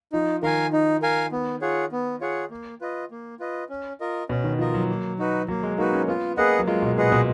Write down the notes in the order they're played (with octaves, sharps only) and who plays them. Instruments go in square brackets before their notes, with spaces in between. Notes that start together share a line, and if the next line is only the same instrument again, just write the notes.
[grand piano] F3 [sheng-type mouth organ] D#4
[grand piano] D#3 [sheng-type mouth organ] A#4 F5 G#5
[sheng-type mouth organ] D#4
A#4 F5 G#5
B3
F4 G#4 C#5 F#5
B3
F4 G#4 C#5 F#5
A#3
F4 B4 D#5
A#3
F4 B4 D#5
C#4
F4 A#4 D#5
[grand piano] B2 [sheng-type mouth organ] C#4
[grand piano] D#3
[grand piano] F3 [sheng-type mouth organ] F4 A#4 D#5
[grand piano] F#3
[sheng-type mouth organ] A#3
D#4 F#4 B4
[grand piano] F#3 [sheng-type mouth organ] A#3
[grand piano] G#3
[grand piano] A#3 [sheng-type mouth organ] D#4 F#4 B4
[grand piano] C#4
[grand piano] B3 [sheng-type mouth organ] F4
[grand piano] A#3 [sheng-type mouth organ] G#4 B4 D#5 F#5
[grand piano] F#3
[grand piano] G#3 [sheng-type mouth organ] F4
[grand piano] B2
[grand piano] A#2 [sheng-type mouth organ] G#4 B4 D#5 F#5
[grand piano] B2